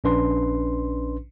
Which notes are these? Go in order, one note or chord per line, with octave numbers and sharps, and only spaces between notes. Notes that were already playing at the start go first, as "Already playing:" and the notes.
A#1 C#4 D4 B4 C6